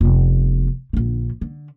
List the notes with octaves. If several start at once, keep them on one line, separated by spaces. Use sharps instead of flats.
F1 B3
A#1 D3
D3